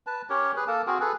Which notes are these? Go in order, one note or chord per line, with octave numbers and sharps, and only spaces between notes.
B4 A5
C#4 G4 A#4 C#5
G#4 B4
A#3 A4 A#4 A5
C4 F#4 G#4 A#4
G#4 A4 B4